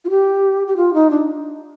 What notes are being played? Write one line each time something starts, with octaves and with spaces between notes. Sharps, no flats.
F4
G4
G4
F4
D#4
D4